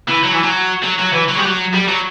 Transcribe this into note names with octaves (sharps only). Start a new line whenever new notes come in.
E3
F#3
E3
F#3
F#3
F#3
E3
F#3
G3
F#3
G3
F#3